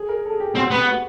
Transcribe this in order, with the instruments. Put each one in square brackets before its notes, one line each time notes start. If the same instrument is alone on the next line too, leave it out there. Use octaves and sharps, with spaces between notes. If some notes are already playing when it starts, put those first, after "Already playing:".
Already playing: [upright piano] G#4
A#4
A4
G#4
G4
[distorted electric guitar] C4 [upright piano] F#4
[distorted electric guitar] B3 [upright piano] G4
[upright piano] F#4